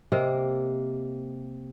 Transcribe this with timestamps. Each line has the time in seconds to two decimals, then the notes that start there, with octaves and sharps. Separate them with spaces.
0.12 C3 A#3 A#4 D#5